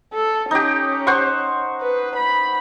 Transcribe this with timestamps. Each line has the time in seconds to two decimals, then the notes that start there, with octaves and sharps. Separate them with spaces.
0.13 A4
0.51 C#4 D#4 G4
1.07 C5 F#5 C#6
1.82 B4
2.16 B5